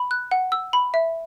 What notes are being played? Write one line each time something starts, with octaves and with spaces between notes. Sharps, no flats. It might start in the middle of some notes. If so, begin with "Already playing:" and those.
Already playing: B5
F#6
F#5
E6
B5
E5